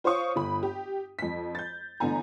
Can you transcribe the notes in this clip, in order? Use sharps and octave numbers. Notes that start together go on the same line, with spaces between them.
F4 C5 C#5 F5 C#6 D#6
G1 B5
G4
F2 B6
G6 A6
A1 D3 B3 G#5 A#5